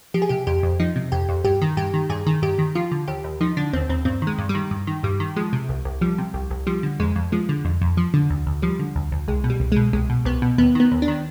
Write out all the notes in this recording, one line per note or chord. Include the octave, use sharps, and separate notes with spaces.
F3 G4
G#4
C3 G4
F2 G4
F2
F3 D#4
C3
F2 G4
F2
G2 G4
D#3
G2 G4
D#3
G2 G#4
D#3
G2 G4
D#3
F3 F4
D3
D#2 G4
D#2
F3 D#4
D3 D4
D#2 C4
D#2 C4
G2 C4
D#3
G#3
G2
G3
D#3
G2
D#3
G2 G3
D#3
F3 G#3
C3
C2
C2
F3 G3
C3
C2
C2
F3 G3
D3
F2 G#3
F2
F3 G#3
D3
F2
F2
F3
D3
D2
D2
F3 G3
D3
D2
D2
C2 G#3
B2
G3
C2
B2 G#3
C2 G#3
B2
C2 B3
B2
D#2 B3
D#3 B3
D#2
D4
D#3